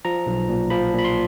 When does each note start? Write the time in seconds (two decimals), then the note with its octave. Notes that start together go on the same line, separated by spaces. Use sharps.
0.05 F3 A#5
0.26 B1
0.49 A#2
0.70 F3 B5
0.93 A#2
0.98 B5
1.04 C6